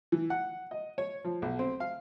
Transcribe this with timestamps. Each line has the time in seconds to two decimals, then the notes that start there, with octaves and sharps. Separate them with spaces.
0.12 E3
0.30 F#5
0.71 D#5
0.98 C#5
1.25 F3
1.42 B1
1.59 C4
1.80 F5